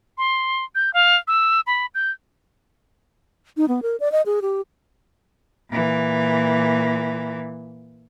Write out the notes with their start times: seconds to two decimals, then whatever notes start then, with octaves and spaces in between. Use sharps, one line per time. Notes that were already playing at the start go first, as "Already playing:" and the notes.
0.18 C6
0.75 G6
0.94 F5
1.28 E6
1.67 B5
1.95 G6
3.57 D#4
3.68 B3
3.82 A#4
4.00 D5
4.12 D#5
4.26 G#4
4.42 G4
5.70 A#2 E3